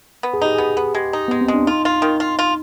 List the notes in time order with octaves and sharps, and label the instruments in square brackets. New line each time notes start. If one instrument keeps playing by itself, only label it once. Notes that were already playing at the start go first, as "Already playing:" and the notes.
[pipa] B3
[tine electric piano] G#4
[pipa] D#4 [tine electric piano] G4
[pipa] B3 [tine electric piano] G#4
[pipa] B3
[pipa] G#3 [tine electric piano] G4
[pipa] D#4
[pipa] G#3 [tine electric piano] B3
[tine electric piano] C4
[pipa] G#3
[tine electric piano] D4
[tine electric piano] D#4 [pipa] F4
[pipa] F4
D#3
F4
F4